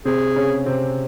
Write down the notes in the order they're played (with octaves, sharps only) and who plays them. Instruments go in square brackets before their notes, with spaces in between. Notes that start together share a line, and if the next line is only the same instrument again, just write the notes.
[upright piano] C3 C4 [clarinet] G#4
[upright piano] C#3 C#4
C3 C4